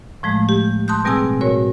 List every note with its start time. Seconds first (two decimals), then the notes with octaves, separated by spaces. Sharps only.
0.23 A2 F3 G#3 A3
0.49 G4
0.88 A5 C6 D#6 F#6 G6
1.05 B2 G3 C4 G#4 G#5 E6
1.41 A2 F#4 A#4 C#5